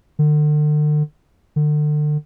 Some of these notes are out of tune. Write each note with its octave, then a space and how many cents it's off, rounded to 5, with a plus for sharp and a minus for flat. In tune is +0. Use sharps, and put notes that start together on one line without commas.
D3 +40
D3 +35